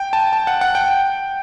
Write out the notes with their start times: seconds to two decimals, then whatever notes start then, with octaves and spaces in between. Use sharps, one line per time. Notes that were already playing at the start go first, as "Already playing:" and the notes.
Already playing: G5
0.13 A5
0.33 A5
0.47 F#5
0.61 F#5
0.75 G5